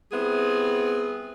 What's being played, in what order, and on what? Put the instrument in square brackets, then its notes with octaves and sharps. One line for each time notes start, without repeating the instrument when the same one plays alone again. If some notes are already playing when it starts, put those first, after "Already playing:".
[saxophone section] G3 B3 C4 E4 G#4